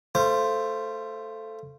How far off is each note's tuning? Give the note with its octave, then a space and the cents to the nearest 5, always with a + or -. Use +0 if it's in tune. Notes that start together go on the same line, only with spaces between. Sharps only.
A3 +0 F4 -30 C5 +0